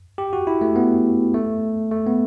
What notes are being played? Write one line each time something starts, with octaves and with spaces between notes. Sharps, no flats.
G4
F#4
E4
A3
B3
A3
A3
B3